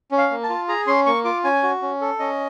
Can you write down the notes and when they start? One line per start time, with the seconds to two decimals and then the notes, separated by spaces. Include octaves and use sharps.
0.12 C#4
0.18 F5
0.31 A#3
0.44 A5
0.49 F4
0.68 G#4 A#5
0.87 C#4 C6
1.06 A#3 C#6
1.24 F4 D6
1.44 C#4 G#5
1.63 F#4
1.82 C#4
2.01 A4
2.19 C#4 D#5